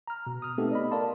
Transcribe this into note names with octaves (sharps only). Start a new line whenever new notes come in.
A#5 F6
B2
D#6 F6
A3 B3 C4 D#4 G4 A4
D5 D#5 B5
A#4 D5 F5 A5 C6